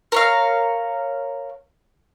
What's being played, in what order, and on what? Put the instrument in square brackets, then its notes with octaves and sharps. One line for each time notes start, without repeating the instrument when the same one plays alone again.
[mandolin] A#4 C#5 F5